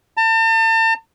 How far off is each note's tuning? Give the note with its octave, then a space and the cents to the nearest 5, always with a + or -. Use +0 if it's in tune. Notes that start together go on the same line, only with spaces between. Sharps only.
A5 +40